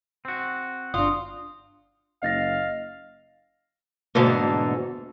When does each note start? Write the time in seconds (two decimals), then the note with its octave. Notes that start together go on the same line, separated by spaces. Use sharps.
0.25 C4 F#4
0.94 G1 D4 F4 D#6
2.23 F#1 D#5 F5 A6 A#6
4.15 E2 G#2 B2 D3 A3 A#3